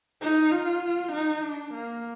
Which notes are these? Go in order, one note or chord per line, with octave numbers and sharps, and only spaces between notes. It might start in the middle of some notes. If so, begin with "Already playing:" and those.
D#4
F4
D#4
D4
A#3